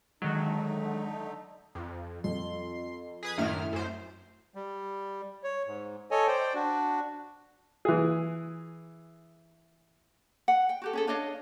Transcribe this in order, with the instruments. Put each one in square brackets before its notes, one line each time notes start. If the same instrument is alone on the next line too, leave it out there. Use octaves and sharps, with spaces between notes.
[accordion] D3 A3 D#4 [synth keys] D#3 F#3 [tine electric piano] G#3
[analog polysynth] F2
[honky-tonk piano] F2 [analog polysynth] C6
[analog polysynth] G#4 B4 D#6
[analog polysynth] F#2 D#3 F6 [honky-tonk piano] A2 E5
[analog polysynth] F#2 C5
[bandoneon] G3
C#5
G#2
A4 C#5 D#5 G#5
C5 D5 G5
D4 F#4
[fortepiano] E3 G#4
[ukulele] F#5
G5
F#4 G4 A4
C#4 G#4 A4
D4 C#5 D#5 F5